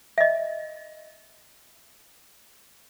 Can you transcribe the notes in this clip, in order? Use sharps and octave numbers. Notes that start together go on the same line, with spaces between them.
D#5 E5